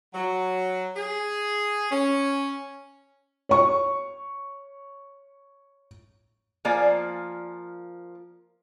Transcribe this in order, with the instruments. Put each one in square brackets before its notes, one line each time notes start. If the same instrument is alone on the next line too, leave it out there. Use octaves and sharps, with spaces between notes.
[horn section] F#3
G#4
C#4
[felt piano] C#5 C#6
[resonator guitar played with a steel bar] F3 A#3 D5 G#5